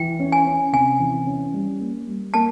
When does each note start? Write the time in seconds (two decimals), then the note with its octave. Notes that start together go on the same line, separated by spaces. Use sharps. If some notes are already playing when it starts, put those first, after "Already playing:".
Already playing: E3 G5
0.19 C#4
0.32 G#5
0.46 C#4
0.73 C3 G#5
1.00 E3
1.26 C#4
1.53 G3
1.80 A#3
2.07 G3
2.34 A#3 A5